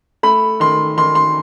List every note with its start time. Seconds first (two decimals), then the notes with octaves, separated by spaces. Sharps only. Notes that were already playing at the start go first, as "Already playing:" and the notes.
0.23 A3 B5
0.60 D#3 C6
0.97 D#3 C6
1.15 C6